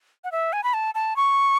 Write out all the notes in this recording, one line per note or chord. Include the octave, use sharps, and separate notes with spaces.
F#5
E5
G#5
B5
A5
A5
C#6